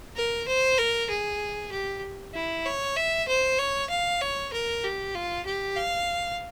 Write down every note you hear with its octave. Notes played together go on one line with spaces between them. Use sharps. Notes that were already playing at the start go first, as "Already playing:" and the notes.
A#4
C5
A#4
G#4
G4
E4
C#5
E5
C5
C#5
F5
C#5
A#4
G4
F4
G4
F5